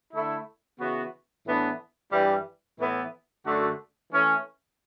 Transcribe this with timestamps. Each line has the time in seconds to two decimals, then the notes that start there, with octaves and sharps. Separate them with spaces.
0.13 D3 A3 E4
0.79 C#3 E3 B3 F#4
1.46 A2 E3 B3 D4
2.12 G2 E3 G3
2.79 A2 E3 B3 E4
3.45 F#2 D3 A3 D4 F#4
4.12 E3 A3 C#4